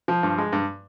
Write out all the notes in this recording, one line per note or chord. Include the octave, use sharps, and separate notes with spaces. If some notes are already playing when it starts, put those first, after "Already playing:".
F3
G2
G#3
G2